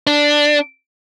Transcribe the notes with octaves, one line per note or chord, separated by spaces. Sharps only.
D4